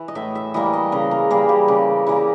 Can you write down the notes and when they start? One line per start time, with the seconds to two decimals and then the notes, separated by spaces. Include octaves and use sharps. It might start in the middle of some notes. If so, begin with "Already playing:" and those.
Already playing: E3
0.08 D#5
0.15 A2 E5
0.35 E5
0.54 E3 G3 A#3 D#5
0.73 D#5
0.92 C#3 A#4
1.11 A#4
1.31 E3 G3 A#3 G#4
1.49 G4
1.68 C#3
2.06 E3 G3 A#3